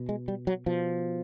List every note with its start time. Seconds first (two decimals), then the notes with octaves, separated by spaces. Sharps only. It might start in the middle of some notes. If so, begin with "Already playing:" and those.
Already playing: B2
0.09 G#3
0.28 G3
0.47 F#3
0.66 B2 F3